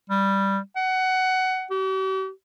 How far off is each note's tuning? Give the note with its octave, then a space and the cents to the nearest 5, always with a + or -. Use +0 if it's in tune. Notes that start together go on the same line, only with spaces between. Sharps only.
G3 +0
F#5 +15
G4 -45